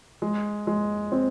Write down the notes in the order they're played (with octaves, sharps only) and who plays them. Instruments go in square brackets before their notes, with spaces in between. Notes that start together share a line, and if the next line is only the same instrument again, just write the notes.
[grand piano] G#3
G#3
C4